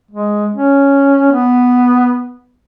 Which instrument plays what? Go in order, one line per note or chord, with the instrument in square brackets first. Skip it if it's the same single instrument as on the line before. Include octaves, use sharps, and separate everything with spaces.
[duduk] G#3
C#4
B3